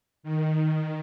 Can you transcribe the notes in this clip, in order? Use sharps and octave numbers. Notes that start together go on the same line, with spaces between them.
D#3